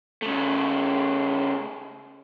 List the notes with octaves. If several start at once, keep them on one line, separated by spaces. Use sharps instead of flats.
C#3 A3